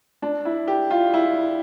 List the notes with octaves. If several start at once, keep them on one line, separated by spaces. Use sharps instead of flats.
D4
E4
G4
F4
E4